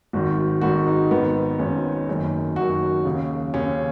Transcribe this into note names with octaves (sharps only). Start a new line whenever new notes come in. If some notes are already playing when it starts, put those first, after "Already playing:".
G#1 G#2 D#3 F#4
G#1 G#2 D#3 F#4
D#4
G#1 G#2 D#3 B3
G#1 G#2 D#3 C#4
F#1 F#2 D#3
F#1 F#2 D#3 F#4
D#2 C#3
D#2 C#3 C#4